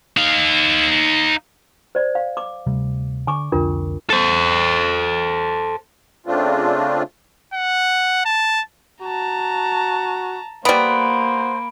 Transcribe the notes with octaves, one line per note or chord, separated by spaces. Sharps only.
D#4 F5
C5 D5
F5
D6
D2 C3 G3
D3 G#5 C#6 D6
C2 F2 D3 D4 F4 A#4
A4 C5
C#3 A3 C4 D4 F4
F#5
A5
F#4 A5 A#5
G3 A#3 B3 C5 B5 D7